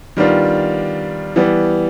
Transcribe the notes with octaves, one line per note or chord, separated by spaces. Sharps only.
D#3 G3 B3 D4 F4
E3 G3 B3